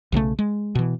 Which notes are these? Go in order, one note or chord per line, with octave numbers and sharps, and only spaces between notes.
B1 C#3 F#3 A3
G#3
B2 E3